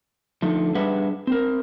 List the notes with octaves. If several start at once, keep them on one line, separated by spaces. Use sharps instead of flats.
D3 F3 A3 D#4 A4
G3 D4 G#4 B4 E5 F#5
C4 A#4